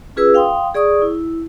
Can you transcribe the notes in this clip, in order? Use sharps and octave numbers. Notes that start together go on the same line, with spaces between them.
C#4 F4 G#4 B4 E6
F5 G5 C6 D#6
G#4 D5 C#6 D#6
E4